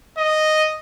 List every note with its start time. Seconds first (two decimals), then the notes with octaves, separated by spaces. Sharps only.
0.18 D#5